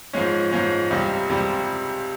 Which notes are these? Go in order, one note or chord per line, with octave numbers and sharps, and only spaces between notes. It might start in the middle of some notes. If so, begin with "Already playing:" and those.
G#2 F3 G#3 C#4
G#2 F3 G#3 C#4
C#2 C3 G3
C#2 C3 G3